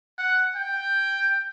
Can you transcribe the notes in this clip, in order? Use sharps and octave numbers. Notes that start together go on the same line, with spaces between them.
F#5
G5